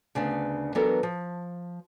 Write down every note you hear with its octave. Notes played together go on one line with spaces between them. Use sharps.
D2 C#3 B3 D4
E3 F#3 B3 D4 A4 A#4
F3